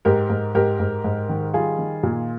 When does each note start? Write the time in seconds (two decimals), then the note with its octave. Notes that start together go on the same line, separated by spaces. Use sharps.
0.05 G#2 G4 A#4
0.30 G#2
0.55 G#2 G4 A#4
0.79 G#2
1.04 G#2
1.29 D#3
1.54 G3 F4 G#4
1.78 D#3
2.03 A#2